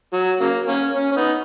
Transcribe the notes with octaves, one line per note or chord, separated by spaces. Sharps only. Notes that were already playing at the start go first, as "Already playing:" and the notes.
F#3
C#3 F#3 A#3
A#3 C#4
C#4
C#4
B3 D#4